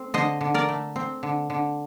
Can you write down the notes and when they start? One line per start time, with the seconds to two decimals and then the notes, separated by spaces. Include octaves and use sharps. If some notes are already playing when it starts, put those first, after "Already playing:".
Already playing: A3 C4
0.14 D3 C5 D#5
0.41 D3
0.54 A#4 D5
0.69 A3
0.96 C4
1.23 D3
1.50 D3